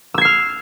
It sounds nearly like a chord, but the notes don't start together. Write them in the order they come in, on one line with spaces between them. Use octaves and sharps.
E6 G#6 C7 F6